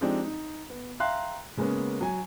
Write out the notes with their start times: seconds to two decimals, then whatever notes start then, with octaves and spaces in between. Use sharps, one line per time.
0.01 F3 G#3 C4 D4 D#4 G4
0.24 D#4
0.70 B3
1.00 E5 F5 G5 A#5 C6 F#6
1.57 C#3 G#3 A#3 B3 C#4
2.01 F#3 G#5